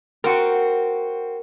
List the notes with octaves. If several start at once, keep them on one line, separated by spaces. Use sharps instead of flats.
C4 F#4 A#4